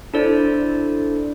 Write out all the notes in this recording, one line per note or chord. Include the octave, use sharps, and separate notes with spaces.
D4 E4 A4 C5 D5